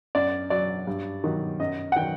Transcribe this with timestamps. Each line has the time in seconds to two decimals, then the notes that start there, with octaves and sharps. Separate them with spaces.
0.15 F#2 D5
0.50 F#3 D5
0.87 G2
1.24 D#3 F#3
1.60 F#2 D#5
1.92 F#5
1.96 D#3 F#3 G5